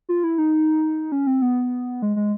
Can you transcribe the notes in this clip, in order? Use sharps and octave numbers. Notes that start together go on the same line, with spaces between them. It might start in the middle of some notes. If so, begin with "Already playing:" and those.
F4
E4
D#4
C#4
C4
B3
G#3
G#3